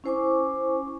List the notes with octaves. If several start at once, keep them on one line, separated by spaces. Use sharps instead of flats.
C#4 E4 C5 G#5 C#6 D6